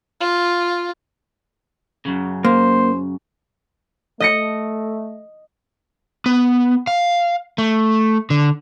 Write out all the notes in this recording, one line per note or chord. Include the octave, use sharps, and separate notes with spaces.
F4
F#2 C#3
A#3 C5
A3 D#5 A#6 C#7
B3
F5
A3
D3